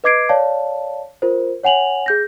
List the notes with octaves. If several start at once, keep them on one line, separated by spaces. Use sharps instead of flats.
B4 D#5 D6 G#6 C7 D7
C#5 D5 F5 A5
F4 A#4 C5
C#5 F#5 G#5 F7 F#7
G#4 G6 A#6